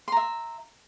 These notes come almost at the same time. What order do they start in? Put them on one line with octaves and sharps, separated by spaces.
C6 A#5 E5